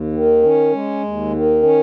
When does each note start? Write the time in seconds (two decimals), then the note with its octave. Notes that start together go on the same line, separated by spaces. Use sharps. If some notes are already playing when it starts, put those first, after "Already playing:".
Already playing: D#2
0.13 D#3
0.43 C#4
0.73 G#3
1.03 D#2
1.33 D#3
1.63 C#4